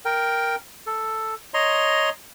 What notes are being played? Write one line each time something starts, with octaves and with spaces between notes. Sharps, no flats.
A#4 G5
A4
C#5 D#5 A#5 C6